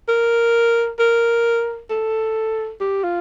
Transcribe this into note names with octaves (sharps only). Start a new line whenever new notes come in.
A#4
A#4
A4
G4
F4